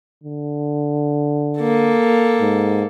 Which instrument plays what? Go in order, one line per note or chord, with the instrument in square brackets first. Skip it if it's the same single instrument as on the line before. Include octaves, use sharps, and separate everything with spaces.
[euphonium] D3
[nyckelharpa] A#3 A4
[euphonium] G#2